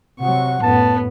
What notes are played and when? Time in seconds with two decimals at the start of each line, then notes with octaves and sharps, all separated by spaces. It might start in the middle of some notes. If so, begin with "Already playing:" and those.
0.20 C3 F#3 F#5 C#6
0.62 F#2 A2 B3 A5